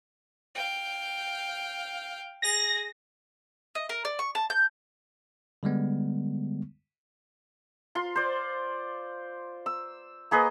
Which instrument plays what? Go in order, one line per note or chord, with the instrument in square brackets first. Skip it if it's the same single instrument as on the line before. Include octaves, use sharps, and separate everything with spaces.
[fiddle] F5 G5
[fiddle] G#4 [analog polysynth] A#6
[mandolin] D#5
A#4
D5
C#6
A5
G6
[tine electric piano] D3 G3 G#3 B3
[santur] F4 C6
C5 D5
E6
A#3 G#4 B4 D#5